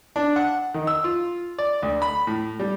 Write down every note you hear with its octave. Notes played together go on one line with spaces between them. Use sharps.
D4
F#5
D#3
E6
F4
D5
D2
B5
A2
G3